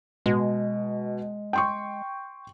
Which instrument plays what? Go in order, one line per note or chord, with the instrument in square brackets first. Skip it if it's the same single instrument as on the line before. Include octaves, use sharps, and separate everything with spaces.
[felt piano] B2 [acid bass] G#3
[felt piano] G5 C6 C#6